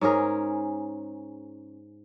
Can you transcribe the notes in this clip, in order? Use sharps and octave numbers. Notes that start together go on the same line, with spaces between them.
G#2 C#4 G#4 A#4